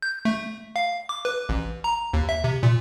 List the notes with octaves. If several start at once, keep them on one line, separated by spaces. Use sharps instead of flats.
G6
A3
F5
D6
B4
A1
A#5
D#2
E5
C3
A#2